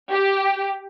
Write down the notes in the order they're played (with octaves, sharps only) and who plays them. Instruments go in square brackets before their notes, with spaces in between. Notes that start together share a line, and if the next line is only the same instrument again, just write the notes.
[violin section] G4